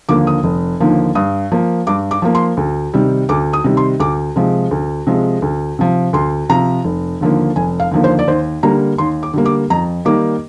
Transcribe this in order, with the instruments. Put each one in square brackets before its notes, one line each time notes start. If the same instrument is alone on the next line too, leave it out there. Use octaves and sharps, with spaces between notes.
[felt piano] D#2 D3 F3 A#3 D6
D#6
F1
D#2 D3 F3 A#3
G2 D#6
F3 A#3
G2 D6
D6
F3 A#3
C6
D2
C3 D#3 G3
D2 D6
D#6
C3 D#3 G3
C6
D2 D6
C3 F3 G#3
D2
C3 F3 G#3
D2
C3 F3
D2 C6
C3 F3 A#5
F1
D#2 D3 F3 A#3
F1 G#5
F5
D#2 D3 F3 A#3
C5
D5
D#2 C5
D3 G3 A#3 A#5
D#2 C6
D6
D3 G3 A#3
D6
F2 A#5
D#3 G3 A#3 D6